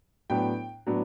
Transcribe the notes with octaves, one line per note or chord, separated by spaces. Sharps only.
A2 F#3 B3 D4 G5
A2 F#3 B3 D4